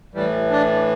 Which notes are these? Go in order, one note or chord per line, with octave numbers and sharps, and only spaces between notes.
A2 E3 G3
D4